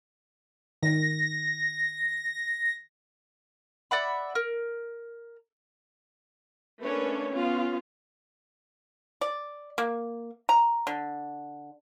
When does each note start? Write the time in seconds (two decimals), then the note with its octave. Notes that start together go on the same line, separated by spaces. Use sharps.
0.83 D#3 A#6
3.91 D5 E5 F#5 B5
4.35 A#4
6.81 A3 A#3 C#4 D4 B4 C#5
7.32 B3 C#4 F4
9.21 D5
9.78 A#3
10.49 A#5
10.87 D3